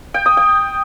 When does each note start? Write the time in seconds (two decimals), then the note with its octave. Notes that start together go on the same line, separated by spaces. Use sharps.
0.14 G5
0.26 D#6
0.37 G5